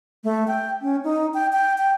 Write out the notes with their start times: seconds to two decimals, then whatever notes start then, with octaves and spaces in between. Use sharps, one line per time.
0.24 A3
0.48 G5
0.82 C#4
1.04 D#4
1.34 G5
1.53 G5
1.78 G5